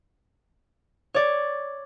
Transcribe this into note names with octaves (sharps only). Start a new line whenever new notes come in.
C#5 D5